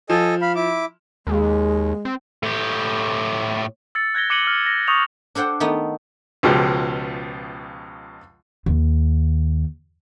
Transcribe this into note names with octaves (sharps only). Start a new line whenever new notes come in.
F3 A4 D#5 G#5
F5 B5
E4 D6
D#2 G#3
C4
A2 G4
E6 A6 C#7
F#6 G#6 A#6 G7
D6 F#6 C#7 D#7 F#7 G7
F6
A#6
C#6 D#6 G6 C#7 F7
D4 A4 C5 F#5 G5
D#3 A3 B3 D#4
C#2 B2 F3 G#3 G4
D#2